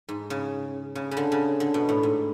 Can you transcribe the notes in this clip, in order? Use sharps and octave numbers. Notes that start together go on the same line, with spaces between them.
G#2
C#3
C#3
C#3
D3
C#3
D3
B2
A2
G#2